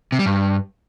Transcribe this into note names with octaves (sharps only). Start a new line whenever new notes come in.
C3
G3
G2